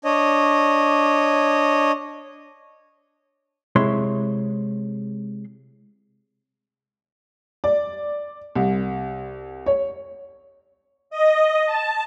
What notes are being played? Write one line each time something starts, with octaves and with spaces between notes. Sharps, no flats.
D4 C#5 D#5
C3 G#3 E4 C#5 C6
D5
C2
C#5
D#5
A5